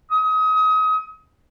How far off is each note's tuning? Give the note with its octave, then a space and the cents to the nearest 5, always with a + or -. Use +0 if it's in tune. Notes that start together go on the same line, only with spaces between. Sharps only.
D#6 +30